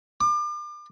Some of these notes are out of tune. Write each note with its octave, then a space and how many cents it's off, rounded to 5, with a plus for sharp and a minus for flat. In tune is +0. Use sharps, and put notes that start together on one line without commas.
D6 +35